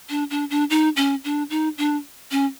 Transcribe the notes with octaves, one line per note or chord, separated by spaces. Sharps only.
D4
D4
D4
D#4
C#4
D4
D#4
D4
C#4